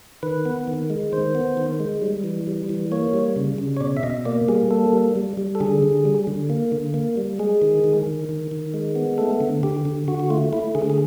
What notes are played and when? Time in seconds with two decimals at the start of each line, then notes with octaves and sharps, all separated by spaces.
0.23 D#3 B4
0.45 B3
0.67 D#3
0.90 G#3
1.12 D#3 C5
1.35 B3
1.57 D#3
1.80 G#3
2.02 G3
2.24 E3
2.47 G3
2.69 E3
2.92 A#3 C#5
3.14 G3
3.36 C#3
3.58 C#3
3.77 C#5
3.81 B2 D5
3.97 E5
4.03 B2 D#5
4.25 A#3 D5
4.48 G3 G#4
4.71 A#3 A4
4.93 G3
5.16 G3
5.37 G3
5.55 A4
5.60 D3 G#4
5.82 D3
6.05 G3
6.27 D3
6.50 A#3
6.72 D3
6.94 A#3
7.17 G3
7.39 G#3 G#4
7.62 D#3
7.84 D#3
8.07 D#3
8.29 D#3
8.51 D#3
8.74 G#3
8.95 B3
9.18 A3 A4
9.41 D3
9.63 D3 G4
9.85 D3
10.08 D3 F#4
10.20 F#4
10.30 A3 F4
10.53 A3 E4
10.75 D3 G#4
10.90 G#4